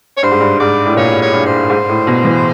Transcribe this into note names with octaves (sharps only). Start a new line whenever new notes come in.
C#5
G2 C5
G#2
G2
G#2 D5
A2
A#2 C#5
C#5
G2
C5
G#2
A2
B2
E3